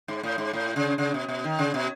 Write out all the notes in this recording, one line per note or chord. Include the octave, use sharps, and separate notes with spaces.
G#2
A2
G#2
A2
C#3
C#3
B2
B2
D#3
C#3
B2